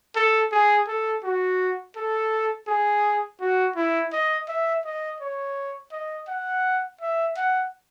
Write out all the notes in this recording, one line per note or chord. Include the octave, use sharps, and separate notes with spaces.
A4
G#4
A4
F#4
A4
G#4
F#4
E4
D#5
E5
D#5
C#5
D#5
F#5
E5
F#5